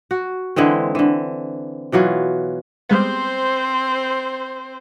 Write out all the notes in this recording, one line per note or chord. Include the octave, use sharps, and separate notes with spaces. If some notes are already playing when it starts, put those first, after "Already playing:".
F#4
D3 E3 G#3 C4
D3 E3
B2 E3 F#3 F4
G3 G#3 B3 C4 C5